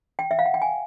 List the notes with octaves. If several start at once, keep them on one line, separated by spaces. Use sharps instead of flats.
G5
E5
F5
F#5
G5
G#5